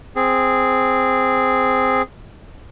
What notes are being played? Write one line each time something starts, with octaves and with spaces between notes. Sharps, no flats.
C4 G#4